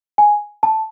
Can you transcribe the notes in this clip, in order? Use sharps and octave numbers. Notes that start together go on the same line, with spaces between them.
G#5
A5